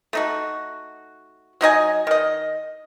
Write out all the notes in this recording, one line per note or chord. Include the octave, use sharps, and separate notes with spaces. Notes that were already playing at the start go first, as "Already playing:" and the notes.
A3 D#4 F#4
F#3 D#4 D#5 G#5
D#3 D#5